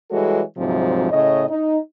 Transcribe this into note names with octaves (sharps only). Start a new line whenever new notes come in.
E3 G3 G#3 F#4 A4 C#5
D2 G#2 C3 F3 F#3 C4
A2 C#3 C#5 D#5
D#4